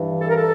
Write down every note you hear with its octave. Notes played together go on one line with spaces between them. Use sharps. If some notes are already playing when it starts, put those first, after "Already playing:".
Already playing: G2 E3
A4
A#4
A4